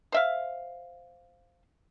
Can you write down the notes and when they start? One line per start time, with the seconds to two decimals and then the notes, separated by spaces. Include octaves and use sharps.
0.12 C5 E5 F5